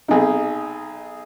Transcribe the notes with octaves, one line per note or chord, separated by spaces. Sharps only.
B1 C3 D#4 G#4